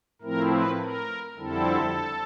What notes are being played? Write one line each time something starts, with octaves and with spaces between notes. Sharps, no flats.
A2 F3 A3 C4 E4 A#4
B4
A#4
F2 D3 G3 C4 E4 A4